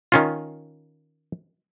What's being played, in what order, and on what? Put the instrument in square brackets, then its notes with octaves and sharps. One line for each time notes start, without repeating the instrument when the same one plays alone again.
[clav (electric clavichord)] D#3 C#4 F4